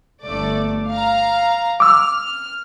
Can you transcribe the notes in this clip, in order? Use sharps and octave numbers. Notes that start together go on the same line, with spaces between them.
G1 A3 D5
F5 A#5
D6 E6 F6
F6